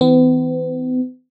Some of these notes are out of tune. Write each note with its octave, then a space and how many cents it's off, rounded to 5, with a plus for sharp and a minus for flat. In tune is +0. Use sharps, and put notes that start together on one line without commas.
E3 -40 B3 +45